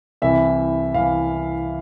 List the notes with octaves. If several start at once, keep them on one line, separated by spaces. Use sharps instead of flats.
C2 C3 E3 E5
C2 C3 E3 F5